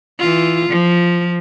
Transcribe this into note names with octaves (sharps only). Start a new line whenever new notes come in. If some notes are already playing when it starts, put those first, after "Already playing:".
E3 F4
F3